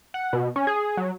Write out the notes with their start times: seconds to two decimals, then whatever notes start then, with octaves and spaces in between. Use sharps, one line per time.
0.14 F#5
0.33 B2
0.56 C#4
0.67 G#4
0.97 F#3